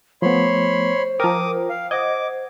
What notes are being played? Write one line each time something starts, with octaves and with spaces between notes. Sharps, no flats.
F3 A3 B3 C5 C#5 B5 C6
F3 A#4 G5 D6 D#6
F5
C5 D#5 F#5 D6 G#6